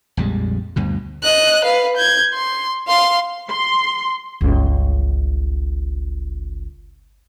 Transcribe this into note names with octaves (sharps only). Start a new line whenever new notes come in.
A#1 F2 G3 G#3
D2 G2 B2
D#5 F#6
B4 F5
G6 G#6
C6
F5 C6
C6
G1 C#2